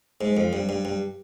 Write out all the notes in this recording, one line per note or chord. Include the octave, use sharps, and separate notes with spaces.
G#2
F2
G2
G2
G2